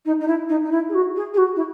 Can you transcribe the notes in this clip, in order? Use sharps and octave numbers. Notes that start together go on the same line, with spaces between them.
D#4
D#4
E4
D#4
D#4
E4
G#4
F#4
G#4
G#4
F#4
E4